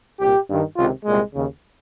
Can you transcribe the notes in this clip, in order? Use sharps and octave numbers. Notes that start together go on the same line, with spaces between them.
C2 A#2 G4
G2 D#3
C#2 C3 D#3 F4
C2 A#2 G#3
D#2 C#3